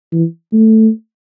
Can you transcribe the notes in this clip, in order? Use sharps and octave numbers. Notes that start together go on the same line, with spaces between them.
E3
A3